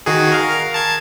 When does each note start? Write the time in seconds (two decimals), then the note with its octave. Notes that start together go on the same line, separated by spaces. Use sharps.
0.06 D#3 F#4 G#4
0.32 A#4 F5
0.74 A5 G#6